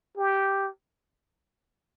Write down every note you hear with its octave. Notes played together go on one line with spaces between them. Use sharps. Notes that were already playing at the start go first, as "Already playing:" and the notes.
G4